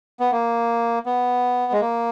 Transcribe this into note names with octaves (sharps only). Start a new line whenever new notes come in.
B3
A#3
B3
G#3
A#3